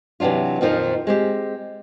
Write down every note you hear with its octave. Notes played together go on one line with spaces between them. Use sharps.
C3 E3 F#3 D4 F4
F2 A#2 D#3 F3 C#4 D#4
G#3 C4 G4